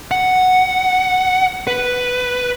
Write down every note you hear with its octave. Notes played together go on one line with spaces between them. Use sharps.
F#5
B4